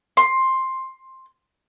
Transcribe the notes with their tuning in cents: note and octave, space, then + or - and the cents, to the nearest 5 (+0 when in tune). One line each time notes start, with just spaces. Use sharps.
C6 +10